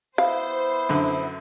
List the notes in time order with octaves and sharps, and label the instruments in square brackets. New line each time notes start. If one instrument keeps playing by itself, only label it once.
[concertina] B3 E4 [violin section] C5 [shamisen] F5
[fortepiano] F#2 D3